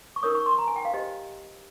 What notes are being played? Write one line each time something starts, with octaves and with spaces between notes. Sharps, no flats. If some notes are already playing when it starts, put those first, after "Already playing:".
C#6
D#4 A#4 C#5 D#6
C#6
C6
A#5
G#5
G5
F5
G4 C5 D#5